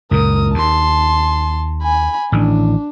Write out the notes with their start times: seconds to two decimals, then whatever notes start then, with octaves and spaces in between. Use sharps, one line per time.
0.11 C#2 F#2 A#2 A#4 D#6
0.54 D#2 A5 C6
1.82 G#5 B5
2.32 A1 A2 D#3 D4